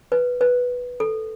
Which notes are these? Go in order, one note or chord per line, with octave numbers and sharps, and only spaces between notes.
B4
B4
A4